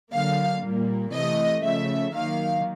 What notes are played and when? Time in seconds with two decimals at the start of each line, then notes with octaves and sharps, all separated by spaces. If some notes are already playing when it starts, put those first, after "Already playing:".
0.13 D3 F#3 A#3 F5
0.62 A#2 G3 A#3
1.13 C3 E3 A3 D#5
1.63 C#3 F3 A3 E5
2.14 D#3 F#3 A#3 F5